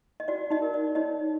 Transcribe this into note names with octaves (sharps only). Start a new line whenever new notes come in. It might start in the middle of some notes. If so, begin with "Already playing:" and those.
D#5
F#4 D5
D#4 D#5
A#4
D5
D#4 C#5 D#5